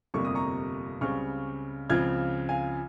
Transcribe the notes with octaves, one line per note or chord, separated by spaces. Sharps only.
G1 F2 C3 G3 A#3 C#6
D#6
A#5 C#6
C#2 C#3 G3 C4 C#6 F6
C#2 C#3 F3 C4 F4 F6 G#6
F5 G#5